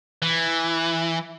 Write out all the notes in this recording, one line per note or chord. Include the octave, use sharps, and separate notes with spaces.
E3